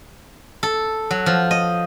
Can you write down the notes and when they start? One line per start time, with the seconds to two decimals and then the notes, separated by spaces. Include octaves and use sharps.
0.63 A4
1.11 F#3
1.26 F3
1.51 D#5